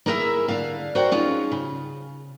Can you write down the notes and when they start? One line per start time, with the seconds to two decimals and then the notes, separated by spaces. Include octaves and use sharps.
0.06 A#3 E4 G#4 A#4 C#5 E5
0.48 D3 F5
0.95 F#4 A#4 C5 D5 F#5 G5
1.12 C#4 D#4 F4 G#4
1.52 C#3